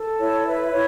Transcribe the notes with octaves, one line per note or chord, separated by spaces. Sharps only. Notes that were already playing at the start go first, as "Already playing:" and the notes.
Already playing: A4
E4 C#5
B4 E5
E4 C#5